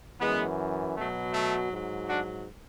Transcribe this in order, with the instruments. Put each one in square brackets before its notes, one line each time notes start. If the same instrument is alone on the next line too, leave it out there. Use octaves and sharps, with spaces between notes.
[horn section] F#2 E3 G#3 B3
B2 F#3 A3
A3
G#2 F#3
D4 F#4